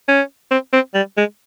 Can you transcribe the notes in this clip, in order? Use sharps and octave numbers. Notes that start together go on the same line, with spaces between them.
C#4
C4
C4
G3
G#3